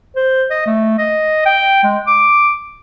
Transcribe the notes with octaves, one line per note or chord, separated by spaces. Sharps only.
C5
D#5
A3
D#5
G5
G#3
D6